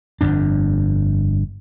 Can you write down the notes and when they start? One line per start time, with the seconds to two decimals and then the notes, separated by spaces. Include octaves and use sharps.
0.21 G1 F2 D4